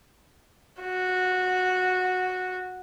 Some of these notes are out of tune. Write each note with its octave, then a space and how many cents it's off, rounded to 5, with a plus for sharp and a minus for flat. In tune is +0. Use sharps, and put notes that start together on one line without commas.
F#4 -10